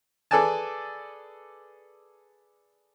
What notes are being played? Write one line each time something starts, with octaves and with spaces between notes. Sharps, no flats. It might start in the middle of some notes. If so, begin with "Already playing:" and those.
G#4 A4 B4 D5 G#5 A5